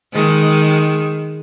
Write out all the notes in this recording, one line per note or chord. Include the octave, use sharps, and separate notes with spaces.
D#3 G#3